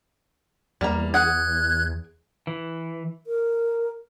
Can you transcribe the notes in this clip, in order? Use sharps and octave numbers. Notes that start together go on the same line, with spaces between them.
E2 G3 A#3 A#5
G#4 F#5 F#6 G#6
E3
A#4